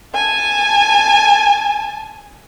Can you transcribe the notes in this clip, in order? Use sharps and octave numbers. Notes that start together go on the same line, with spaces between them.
G#5 A5